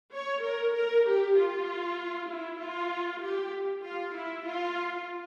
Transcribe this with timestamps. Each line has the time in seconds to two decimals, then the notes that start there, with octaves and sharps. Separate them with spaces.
0.14 C#5
0.45 A#4
0.75 A#4
1.07 G4
1.37 F4
2.29 E4
2.60 F4
3.23 G4
3.85 F4
4.15 E4
4.46 F4